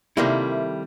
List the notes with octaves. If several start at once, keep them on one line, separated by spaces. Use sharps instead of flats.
C3 D#3 G3 A3 A#3 E4